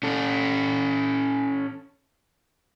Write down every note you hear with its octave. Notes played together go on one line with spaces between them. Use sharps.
C#4 A4